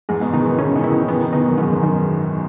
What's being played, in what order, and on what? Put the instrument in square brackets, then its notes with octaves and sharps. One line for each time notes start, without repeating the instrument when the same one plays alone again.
[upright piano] E2 G#2 [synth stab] G#3
[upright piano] G#2 B2
[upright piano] B2 D#3 [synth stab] D#4
[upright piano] C#3 E3
[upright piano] B2 D#3 [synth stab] C#4
[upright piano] B2 D#3
[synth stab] E4
[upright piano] B2 D#3
[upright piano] C#3 E3 [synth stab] B3
[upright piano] B2 D#3
[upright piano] B2 D#3 [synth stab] D#4
[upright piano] F#2
[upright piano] E2 G#2 [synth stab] B3
[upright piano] F#2
[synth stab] D#3